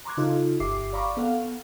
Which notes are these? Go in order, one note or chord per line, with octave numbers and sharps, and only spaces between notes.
A#5 C6 D6 F#6 G#6
C#3 D#4 F4 A4
G1 G4 E5 D6 C7
D5 F5 A#5 B5 C#6 D6
B3 A4 F5 F#5